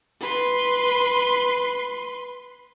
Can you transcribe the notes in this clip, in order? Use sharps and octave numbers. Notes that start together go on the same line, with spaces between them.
B4 C6